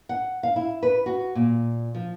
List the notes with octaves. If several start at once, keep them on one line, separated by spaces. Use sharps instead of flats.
F#5
F5
E4
B4
F#4
A#2
F3